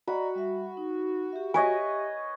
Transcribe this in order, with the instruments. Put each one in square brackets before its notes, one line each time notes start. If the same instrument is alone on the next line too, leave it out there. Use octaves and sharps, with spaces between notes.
[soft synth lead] F#4 [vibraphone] D5 D#5 A#5 [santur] B5
[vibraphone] G3 E5
D#4
G4 E5
[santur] B4 C#5 D#5 [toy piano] G#5